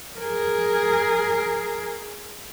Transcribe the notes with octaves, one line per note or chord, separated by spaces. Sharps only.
G#4 A#4